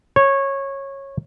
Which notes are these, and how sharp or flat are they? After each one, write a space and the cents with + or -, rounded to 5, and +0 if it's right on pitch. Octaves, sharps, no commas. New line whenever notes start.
C#5 -15